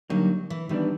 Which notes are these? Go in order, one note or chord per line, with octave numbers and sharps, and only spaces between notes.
D3 F#3 G3 A#3 D#4
E3
D#3 E3 G3 B3 D4